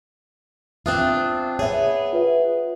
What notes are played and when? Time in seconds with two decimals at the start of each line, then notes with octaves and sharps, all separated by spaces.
0.86 C4 D4 F4 E5 D#6 F#6
1.59 B3 G#4 C#5 E5
2.13 F4 B4 E5